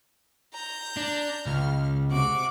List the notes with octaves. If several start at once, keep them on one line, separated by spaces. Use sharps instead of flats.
A#5 G6
D4
C#2 F6
C3 F#4 D6